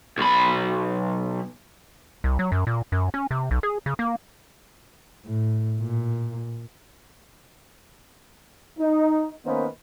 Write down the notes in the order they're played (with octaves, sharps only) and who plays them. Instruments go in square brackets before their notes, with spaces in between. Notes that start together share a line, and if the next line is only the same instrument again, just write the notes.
[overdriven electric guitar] B1 B5
[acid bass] C2
F#3
F#2
A#2
F#2
C#4
C3
B1
G#4
C#3
A#3
[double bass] A2
A#2
[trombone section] D#4
D#3 A#3 B3 C#4 B4 C5